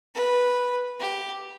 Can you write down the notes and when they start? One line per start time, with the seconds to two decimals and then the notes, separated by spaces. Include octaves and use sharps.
0.15 B4
1.00 G4